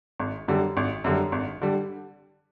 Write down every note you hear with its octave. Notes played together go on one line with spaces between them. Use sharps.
G#1
F#2 D3 G3
G#1
F#2 D3 G3
G#1
D3 G3